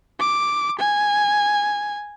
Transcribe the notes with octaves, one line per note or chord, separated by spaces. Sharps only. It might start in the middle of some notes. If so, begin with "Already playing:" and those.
D6
G#5